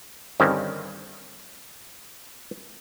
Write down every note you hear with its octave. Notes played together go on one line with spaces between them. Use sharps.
G2 D3 D#3 C4 C#4